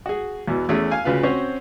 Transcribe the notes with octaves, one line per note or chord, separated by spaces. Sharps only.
F#4 G#4
E2 B2 E3
E2 A3 C#4 G#4
F5 G#5
D2 C#3 F4 B4 F5
C4 C#4 F#4 C5 C#5